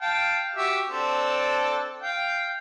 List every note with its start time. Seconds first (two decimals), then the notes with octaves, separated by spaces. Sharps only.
0.02 F5 G5 A5
0.56 F#4 G4 E5
0.89 C4 D4 A4
2.02 F5 G5